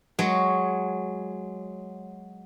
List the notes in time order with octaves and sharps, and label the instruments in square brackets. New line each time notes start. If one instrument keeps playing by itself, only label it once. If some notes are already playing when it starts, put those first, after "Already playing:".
[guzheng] F#3 G#3 C#5